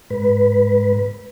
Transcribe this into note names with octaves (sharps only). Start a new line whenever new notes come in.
G#2 B4